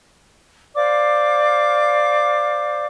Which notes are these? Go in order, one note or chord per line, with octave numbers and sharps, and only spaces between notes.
C5 D5 F5 D6